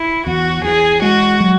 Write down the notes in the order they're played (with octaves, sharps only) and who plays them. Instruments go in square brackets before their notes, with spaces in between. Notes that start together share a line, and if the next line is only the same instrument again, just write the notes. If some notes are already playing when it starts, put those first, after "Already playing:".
Already playing: [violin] E4
[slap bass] E2 [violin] F#4
[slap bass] E2 [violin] G#4
[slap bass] G#3 [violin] F#4
[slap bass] F#3